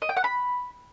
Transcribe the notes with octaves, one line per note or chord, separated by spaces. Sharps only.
D#5
G5
F#5
B5